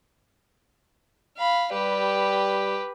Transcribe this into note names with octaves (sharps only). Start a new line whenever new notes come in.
F5 B5
G3 G4 B4